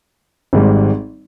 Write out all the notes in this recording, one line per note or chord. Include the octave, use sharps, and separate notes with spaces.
G#1 G#2 G3